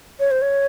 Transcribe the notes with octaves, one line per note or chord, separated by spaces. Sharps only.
C#5
C5
C#5